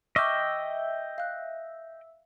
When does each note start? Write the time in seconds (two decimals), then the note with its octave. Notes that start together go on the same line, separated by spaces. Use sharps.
0.16 D#5 E5 G5 C#6 D6 F6
1.18 F5 F#6